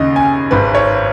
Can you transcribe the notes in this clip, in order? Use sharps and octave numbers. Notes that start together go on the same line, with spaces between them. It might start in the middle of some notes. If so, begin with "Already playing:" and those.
Already playing: D#2 C#3 D#5
G#5
G#1 G#2 D#3 B4
C#5